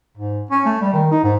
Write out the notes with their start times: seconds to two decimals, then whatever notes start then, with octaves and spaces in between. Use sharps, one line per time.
0.17 G#2
0.51 C#4
0.66 A3
0.82 G3
0.93 D#3
1.12 D#4
1.24 G#2